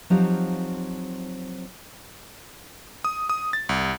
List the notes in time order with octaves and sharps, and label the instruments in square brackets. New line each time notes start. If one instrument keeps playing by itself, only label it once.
[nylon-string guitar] F3 F#3 C4 D#4 F4 G4
[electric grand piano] D#6
D#6
A6
C2